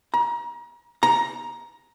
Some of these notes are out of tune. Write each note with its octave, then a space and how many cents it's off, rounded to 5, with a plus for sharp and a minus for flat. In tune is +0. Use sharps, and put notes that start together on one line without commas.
A#5 +35
A#5 +10